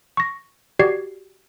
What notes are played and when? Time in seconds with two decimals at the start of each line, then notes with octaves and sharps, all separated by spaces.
0.17 C#6 A#6
0.79 F#4 G4 D5 G#6 C7